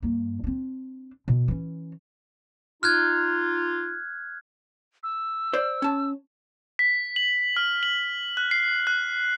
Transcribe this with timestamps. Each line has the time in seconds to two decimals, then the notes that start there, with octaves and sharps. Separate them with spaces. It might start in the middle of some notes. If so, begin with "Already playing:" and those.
0.03 G2 A#3
0.44 C4 D4
1.28 B2
1.48 E3 C#4
2.83 D#4 F4 F6 F#6 G#6
5.03 E6
5.53 C5 D5
5.82 C#4 A5
6.79 B6
7.16 F#7
7.57 F6
7.83 F#7
8.37 F#6
8.51 C7
8.87 F#6